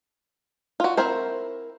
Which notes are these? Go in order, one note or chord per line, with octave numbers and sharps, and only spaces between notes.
F4 F#4
C4 E4 A#4 C5